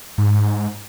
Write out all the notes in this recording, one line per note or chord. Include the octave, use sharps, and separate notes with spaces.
G#2